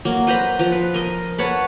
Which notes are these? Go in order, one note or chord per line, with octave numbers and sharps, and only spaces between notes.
F#3 A#3
B4 C5 A#5 B5
F3 A#5
B4
A#4 D#5
B4 C#5 F#5 A5